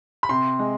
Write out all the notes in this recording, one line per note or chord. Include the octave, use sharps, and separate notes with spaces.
B5
C3 C6
G#3